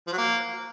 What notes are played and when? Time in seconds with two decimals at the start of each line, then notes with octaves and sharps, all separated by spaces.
0.07 F3
0.12 F#3
0.18 A#3